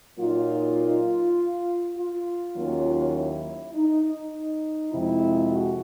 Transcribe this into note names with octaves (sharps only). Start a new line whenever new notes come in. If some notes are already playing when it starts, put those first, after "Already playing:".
A#2 F#3 A#3 D#4 F4
F4
D#2 D#3 F#3 A#3 C#4
E4
D#4
D#4
F2 C3 F3 G#3 E4
F#4